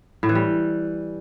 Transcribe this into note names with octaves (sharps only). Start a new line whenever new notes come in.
A2
E3
G3